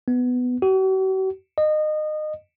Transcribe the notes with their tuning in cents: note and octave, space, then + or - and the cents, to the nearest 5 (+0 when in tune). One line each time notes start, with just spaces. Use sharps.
B3 +10
F#4 +45
D#5 -25